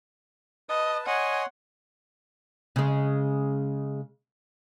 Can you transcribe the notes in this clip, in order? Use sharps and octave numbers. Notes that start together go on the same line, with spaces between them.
B4 D#5 A5
C#5 D#5 F#5 G#5 C6
C#3 G#3